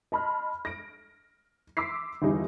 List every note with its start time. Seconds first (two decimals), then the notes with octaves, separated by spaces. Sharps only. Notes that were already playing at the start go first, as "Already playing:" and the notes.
0.12 D#5 A5 B5 C6 F6
0.65 A#6 D7
1.77 C6 D6 E6 B6 C7
2.22 G1 E2 G3 D#4 E4